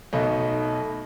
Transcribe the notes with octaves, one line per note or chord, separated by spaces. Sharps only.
B1 B2 A3 D#4